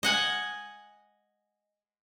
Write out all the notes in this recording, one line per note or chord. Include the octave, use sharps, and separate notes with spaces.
D#5 F#5 G#5